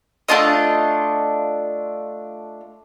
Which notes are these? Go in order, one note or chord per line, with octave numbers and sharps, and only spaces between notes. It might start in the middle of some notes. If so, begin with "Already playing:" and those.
A3 D4 F4 D#5